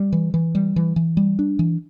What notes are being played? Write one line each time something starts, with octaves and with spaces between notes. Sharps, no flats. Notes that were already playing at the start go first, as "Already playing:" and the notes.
Already playing: G3
E3
E3
G3
E3
E3
G3
D4
E3